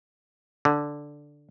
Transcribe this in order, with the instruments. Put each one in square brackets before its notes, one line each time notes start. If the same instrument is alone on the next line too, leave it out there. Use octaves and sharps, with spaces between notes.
[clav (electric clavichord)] D3